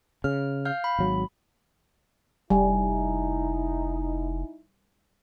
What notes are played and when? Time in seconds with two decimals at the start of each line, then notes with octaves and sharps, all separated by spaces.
0.24 C#3 F6
0.65 F5 F6 G6
0.84 B5
0.99 G#1 F#3
2.50 F1 G3 D#4 E4 G#5